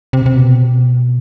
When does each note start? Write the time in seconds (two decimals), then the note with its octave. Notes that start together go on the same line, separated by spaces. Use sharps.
0.13 C3
0.26 C3
0.36 B2